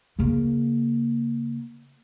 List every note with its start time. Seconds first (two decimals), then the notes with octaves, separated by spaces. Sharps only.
0.19 C#3 A#3